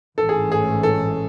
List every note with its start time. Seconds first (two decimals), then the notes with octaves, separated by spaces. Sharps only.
0.18 A1 G#2 E3 A3 C#4 A4
0.29 G#4
0.52 G#4
0.83 A4